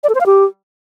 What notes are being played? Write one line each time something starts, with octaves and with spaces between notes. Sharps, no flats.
D5
A4
C5
F5
G4